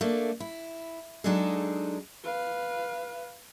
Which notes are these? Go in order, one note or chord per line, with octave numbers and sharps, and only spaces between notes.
A3 A#3 D4
E4
F#3 G#3 D4 D#4 G#4 A4
B4 F5